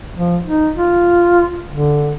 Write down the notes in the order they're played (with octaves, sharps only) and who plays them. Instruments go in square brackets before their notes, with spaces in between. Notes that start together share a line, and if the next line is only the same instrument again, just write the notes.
[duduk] F3
D#4
F4
D3